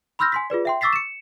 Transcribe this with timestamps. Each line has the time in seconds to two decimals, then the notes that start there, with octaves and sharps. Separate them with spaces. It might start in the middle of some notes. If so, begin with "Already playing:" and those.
0.19 B5 C6 E6 F6 G6 A#6
0.32 G#5 C6 B6
0.50 F4 G#4 B4 D5
0.65 E5 G5 C6
0.81 C#6 D6 E6 A6 B6 C7
0.93 C#7 E7